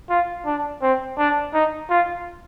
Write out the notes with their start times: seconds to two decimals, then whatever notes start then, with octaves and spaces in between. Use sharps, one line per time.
0.10 F4
0.46 D4
0.82 C4
1.18 D4
1.54 D#4
1.90 F4